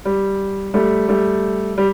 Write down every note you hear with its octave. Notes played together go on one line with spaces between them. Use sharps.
G3
G3 A3
G3 A3
G3